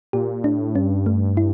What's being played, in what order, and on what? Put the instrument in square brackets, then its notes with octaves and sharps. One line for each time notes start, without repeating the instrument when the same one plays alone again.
[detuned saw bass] A#2 [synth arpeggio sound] G4
[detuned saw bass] A2 [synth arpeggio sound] D4
[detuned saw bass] G2 [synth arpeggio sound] C#4
[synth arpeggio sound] A3
E4